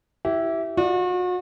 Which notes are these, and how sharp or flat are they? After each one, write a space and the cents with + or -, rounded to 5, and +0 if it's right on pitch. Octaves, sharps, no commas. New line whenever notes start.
E4 +0 G4 -30
F#4 -40 D5 +15